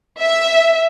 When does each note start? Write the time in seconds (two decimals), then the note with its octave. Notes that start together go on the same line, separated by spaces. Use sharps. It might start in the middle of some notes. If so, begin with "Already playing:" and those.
0.21 E5